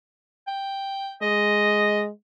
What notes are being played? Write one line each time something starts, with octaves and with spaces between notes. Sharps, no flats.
G5
G#3 D#5